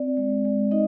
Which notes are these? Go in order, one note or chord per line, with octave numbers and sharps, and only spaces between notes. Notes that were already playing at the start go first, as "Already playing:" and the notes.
Already playing: C4 D5
G#3
G#3
D#4 D#5